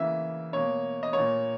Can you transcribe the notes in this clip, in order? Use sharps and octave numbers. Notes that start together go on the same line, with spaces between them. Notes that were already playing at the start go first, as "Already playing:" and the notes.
Already playing: C#3 E3 A#3 E5
B2 A#3 C#5
D#5
A#2 A#3 C#5